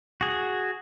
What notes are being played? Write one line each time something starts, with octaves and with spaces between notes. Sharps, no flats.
F#4 G#4